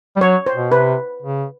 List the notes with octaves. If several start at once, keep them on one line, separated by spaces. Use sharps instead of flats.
G3
F#3 C#5
C5
B2
C3 B4
C#3